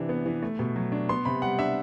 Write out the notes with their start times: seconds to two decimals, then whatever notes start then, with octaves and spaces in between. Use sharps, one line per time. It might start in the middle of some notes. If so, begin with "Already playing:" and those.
Already playing: C3 E3 D4
0.09 B3
0.26 E3
0.43 A3
0.59 B2
0.76 F#3
0.92 D4
1.09 B3 C6
1.25 C3 B5
1.42 G3 F#5
1.59 D4 E5